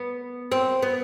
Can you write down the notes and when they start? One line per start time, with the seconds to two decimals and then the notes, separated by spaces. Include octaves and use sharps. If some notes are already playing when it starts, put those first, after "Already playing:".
Already playing: B3
0.52 C4
0.82 B3